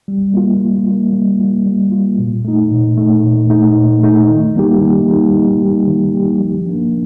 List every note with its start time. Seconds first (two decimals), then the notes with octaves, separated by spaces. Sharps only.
0.08 G3
0.34 A#3 F4
0.60 G3
0.86 A#3 F4
1.13 G3
1.40 A#3 F4
1.66 G3
1.92 A#3 F4
2.19 A#2
2.45 A3 D#4
2.71 A#2
2.97 A3 D#4
3.23 A#2
3.50 A3 D#4
3.77 A#2
4.03 A3 D#4
4.29 D#3
4.56 G3 A#3 D#4 G4
4.82 D#3
5.08 G3 A#3 D#4 G4
5.35 D#3
5.61 G3 A#3 D#4 G4
5.87 D#3
6.14 G3 A#3 D#4 G4
6.40 F3
6.66 A#3 D4